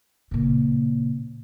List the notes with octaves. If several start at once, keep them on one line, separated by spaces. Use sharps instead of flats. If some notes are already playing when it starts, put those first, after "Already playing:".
A#2 C#3